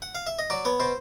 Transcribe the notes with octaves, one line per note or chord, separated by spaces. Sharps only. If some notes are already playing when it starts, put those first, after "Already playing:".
F#5
F5
E5
D#5
F#3 D5
B3 C#5
B2 C5